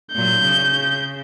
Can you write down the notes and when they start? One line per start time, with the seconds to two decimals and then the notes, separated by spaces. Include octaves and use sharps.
0.15 A#2 F#3 G6
0.45 C#3